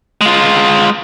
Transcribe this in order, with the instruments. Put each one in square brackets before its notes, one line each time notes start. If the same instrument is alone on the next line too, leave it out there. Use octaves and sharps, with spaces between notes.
[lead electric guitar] G#3 F4